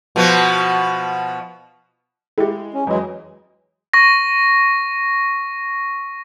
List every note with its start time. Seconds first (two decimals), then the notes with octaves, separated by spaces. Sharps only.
0.16 B2 F3 B3
2.38 G#3 E4 G4
2.74 C#4
2.87 F2 E3 F#3 G#3 D#5
3.94 C#6 A#6